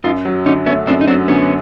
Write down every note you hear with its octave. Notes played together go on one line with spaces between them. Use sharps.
F#2 D#4 F4
F#3
D3 C#4 D#4
A3 B3 C#4
F#2 C4 D4
D#4
F#3 C4 D4
D3 B3 C#4